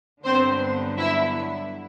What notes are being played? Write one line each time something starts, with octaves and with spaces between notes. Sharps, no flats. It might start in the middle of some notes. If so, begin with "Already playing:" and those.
G2 D3 F#3 B3 C4 C5
E4 E5